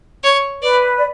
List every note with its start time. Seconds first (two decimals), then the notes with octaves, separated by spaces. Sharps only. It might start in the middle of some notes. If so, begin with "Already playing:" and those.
0.24 C#5
0.62 B4 D5
0.96 D5